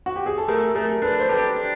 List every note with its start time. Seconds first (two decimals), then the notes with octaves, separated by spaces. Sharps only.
0.06 F#4
0.16 G4
0.26 G#4
0.38 A4
0.48 A3 G#4 A#4
0.75 A3 G#4 A#4
1.02 D4 A4 B4
1.19 C5
1.29 G4 A4 B4
1.56 D4